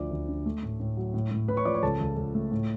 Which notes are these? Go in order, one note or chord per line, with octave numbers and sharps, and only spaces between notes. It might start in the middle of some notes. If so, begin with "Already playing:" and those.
Already playing: D2 F3 D5 D6
D2
D3
A3
A2
A2
F#3
A2
A2
A2 B4 B5
C#5 C#6
F3 D5 D6
C#5 C#6
C#2 A4 A5
C#2
C#2
A3
A2